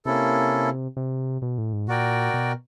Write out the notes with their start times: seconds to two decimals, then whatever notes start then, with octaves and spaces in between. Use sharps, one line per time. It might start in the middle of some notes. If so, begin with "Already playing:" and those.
0.05 C3 A#3 C#4 E4 A4
0.97 C3
1.42 B2
1.58 A2
1.73 G#2
1.88 A#2 F#4 A#4 D5 G5
2.34 B2